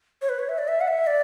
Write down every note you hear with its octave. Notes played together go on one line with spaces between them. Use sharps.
C#5
B4
C#5
E5
D5
E5
F#5
E5
D5